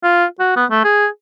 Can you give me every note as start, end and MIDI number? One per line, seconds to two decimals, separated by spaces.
0.03 0.25 65
0.40 0.54 66
0.57 0.65 59
0.71 0.81 57
0.84 1.08 68